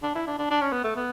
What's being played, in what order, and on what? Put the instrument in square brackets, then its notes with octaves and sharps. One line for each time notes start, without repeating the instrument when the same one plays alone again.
[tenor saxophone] D4
E4
D4
D4
D4
C#4
B3
A3
B3